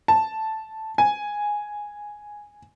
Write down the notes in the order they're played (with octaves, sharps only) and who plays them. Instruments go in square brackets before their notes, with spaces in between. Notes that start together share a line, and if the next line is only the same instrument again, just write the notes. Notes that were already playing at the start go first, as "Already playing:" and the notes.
[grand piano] A5
G#5